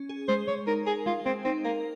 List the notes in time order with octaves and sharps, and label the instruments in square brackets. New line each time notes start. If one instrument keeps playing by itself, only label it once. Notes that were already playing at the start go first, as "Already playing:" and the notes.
Already playing: [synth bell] C#4
G#4
[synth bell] G#3 [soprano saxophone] C5
[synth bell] G#3 [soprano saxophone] C#5
[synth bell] D#4 [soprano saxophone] A#4
[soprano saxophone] G#4 [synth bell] A#4
[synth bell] G#3 [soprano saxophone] F4
[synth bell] G#3 [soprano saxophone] C4
[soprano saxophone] C4 [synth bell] D#4
[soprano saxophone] A#3 [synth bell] A#4